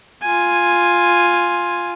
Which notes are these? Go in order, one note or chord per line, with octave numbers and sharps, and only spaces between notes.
F4 G#5